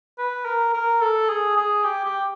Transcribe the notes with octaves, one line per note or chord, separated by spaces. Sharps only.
B4
A#4
A#4
A4
G#4
G#4
G4
G4